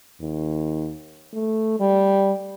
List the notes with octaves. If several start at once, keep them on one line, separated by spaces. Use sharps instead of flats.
D#2
A3
G3